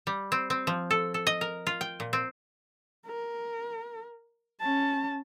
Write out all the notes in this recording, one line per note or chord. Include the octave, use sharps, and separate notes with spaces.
G3
C4
C4
F3
A4
A4
D#5
A#4
F4
G5
A#2
C4
A#4
C#4 A5